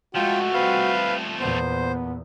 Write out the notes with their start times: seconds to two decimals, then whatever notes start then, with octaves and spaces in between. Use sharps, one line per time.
0.15 F3 G#3 A3 F4 F#4 G5
0.54 G3 C4 B4 F5
1.40 E2 A#2 B3 C5